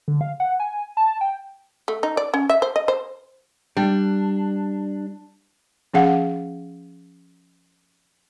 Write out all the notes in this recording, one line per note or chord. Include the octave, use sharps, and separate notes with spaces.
D3
F5
F#5
G#5
A5
G5
A3
D#4
D5
C#4
E5
C5
D#5
C5
G3 D4
F3 C#4 G#4 F5 F#5